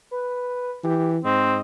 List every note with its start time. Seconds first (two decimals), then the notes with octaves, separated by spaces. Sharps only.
0.11 B4
0.84 E3 G4
1.25 G#2 C4 D#5